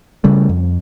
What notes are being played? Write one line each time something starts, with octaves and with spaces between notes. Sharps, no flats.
C#3 G3 A3
F2